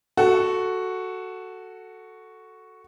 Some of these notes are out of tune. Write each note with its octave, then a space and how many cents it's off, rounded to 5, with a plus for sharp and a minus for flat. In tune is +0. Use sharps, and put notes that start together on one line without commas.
F#4 +0 A4 +0